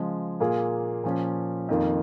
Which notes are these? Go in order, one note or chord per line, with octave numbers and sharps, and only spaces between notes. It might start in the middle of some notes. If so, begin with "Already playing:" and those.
Already playing: C#3 F3 G#3
A#2 A#3 F4 G#4
A#2 F3 C#4
F2 D#3 A#3 F4